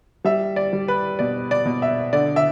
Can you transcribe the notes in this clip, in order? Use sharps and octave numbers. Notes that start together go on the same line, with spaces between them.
G3 E5
D5
G3
B4
B2 D5
D5
B2
E5
D3 D5
E5